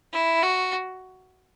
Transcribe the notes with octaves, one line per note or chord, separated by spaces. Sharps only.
E4
F#4